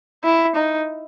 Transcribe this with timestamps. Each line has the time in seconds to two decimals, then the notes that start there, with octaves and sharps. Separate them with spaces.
0.24 E4
0.55 D#4